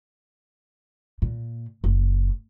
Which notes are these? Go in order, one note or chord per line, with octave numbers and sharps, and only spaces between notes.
A#2
F#1